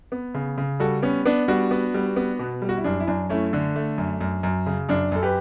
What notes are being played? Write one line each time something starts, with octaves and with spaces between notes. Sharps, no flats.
B3
C#3
C#3
G3 F#4 A4
B3 C#4
B3 D4
G3 D4 F#4
B3
G3
B3
B2
G3
F#4
E4
F#2 D4
E4
F#2 D4
A3 C#4 E4
D3 D4
A3
F#2
F#2
F#2
C#3
F#2 D4
F#2 A4
G4 B4